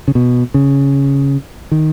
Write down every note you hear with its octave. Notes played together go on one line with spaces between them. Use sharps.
C#3
B2
C#3
D#3